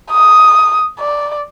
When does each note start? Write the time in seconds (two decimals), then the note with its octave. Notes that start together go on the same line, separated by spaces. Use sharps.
0.11 D#6
1.00 D5